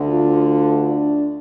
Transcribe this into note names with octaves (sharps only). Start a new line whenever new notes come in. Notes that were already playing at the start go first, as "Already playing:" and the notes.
Already playing: D2 D3
F4
D4